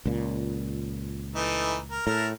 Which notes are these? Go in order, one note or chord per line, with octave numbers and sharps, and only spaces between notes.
C#2 A#2
E3 A3 D#4
A#4
A2 A3 A#4